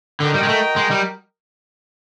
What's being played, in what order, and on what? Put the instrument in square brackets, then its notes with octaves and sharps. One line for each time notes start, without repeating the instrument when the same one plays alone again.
[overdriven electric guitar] D3 [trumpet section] F#4 A#4 D#5 G5
[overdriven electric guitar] G3
G#3
A3
G#3
G3